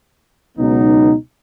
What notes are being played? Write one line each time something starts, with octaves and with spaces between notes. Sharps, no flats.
C#2 B2 F#3 B3 D#4